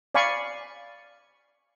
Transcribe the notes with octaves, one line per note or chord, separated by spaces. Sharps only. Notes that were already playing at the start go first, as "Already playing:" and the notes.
D5 F5 G#5 B5 C#6